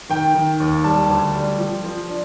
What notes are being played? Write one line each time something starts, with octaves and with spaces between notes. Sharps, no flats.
D#3 G5
D#3
D#2
G3 A5
D2
G3
F3
F3
D4